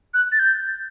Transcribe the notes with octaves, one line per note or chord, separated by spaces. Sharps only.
F#6
A6
G6